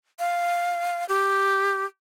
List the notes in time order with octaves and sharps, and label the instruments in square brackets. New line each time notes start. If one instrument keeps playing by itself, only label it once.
[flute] F5
G4